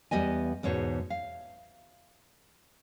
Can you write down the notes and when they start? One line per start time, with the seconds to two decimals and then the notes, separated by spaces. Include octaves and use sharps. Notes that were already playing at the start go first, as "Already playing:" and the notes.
0.11 E2 G3 B3 D#5 G#5
0.63 E2 G#2 B2 C#5
1.10 F5